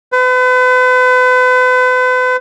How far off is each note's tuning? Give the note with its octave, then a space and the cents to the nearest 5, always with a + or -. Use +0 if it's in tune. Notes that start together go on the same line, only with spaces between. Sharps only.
B4 +40